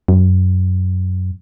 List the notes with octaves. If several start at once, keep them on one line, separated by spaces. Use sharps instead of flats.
F#2